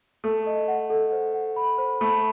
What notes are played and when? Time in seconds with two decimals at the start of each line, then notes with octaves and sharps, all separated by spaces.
0.24 A3 A4
0.46 D#5
0.68 F#5
0.90 A4
1.12 C5
1.34 F#5
1.56 B5
1.78 C5
2.00 A3 B5